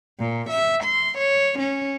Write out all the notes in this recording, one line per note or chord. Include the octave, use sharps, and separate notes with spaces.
A#2
E5
C6
C#5
C#4